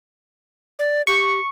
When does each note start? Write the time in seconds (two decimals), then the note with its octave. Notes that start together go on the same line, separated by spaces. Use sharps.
0.79 D5
1.07 G4 C#6